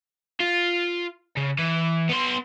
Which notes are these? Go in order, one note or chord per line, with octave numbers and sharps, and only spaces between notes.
F4
C#3
E3
B3 C6